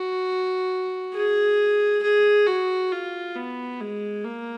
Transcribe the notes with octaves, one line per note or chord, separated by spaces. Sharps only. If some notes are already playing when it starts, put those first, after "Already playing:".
Already playing: F#4
G#4
G#4
F#4
F4
B3
G#3
A#3